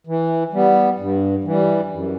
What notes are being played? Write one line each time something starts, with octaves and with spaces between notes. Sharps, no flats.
E3
G3 B3
G2
E3 G3
F#2